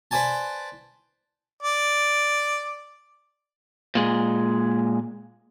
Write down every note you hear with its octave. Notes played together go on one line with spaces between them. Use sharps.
B4 C5 D5 G#5 A5
D5
A#2 G#3